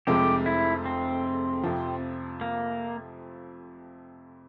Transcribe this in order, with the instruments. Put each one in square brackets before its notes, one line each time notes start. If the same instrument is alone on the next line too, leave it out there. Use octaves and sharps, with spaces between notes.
[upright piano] F1 F2 C3 F3 G#3 [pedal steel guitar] G4
[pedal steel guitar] E4
C4
[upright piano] F2 C3 F3
[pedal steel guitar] A#3